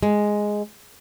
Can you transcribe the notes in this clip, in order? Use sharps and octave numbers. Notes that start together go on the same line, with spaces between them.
G#3